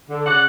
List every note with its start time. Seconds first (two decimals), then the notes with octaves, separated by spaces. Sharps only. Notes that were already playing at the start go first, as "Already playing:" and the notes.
0.09 D3
0.26 C#3 D5 F#5